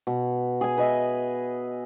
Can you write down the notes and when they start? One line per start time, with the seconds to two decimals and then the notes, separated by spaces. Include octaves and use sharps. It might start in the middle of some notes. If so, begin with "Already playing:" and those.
0.07 B2
0.61 G#4 G#5
0.78 B4 D#5 E5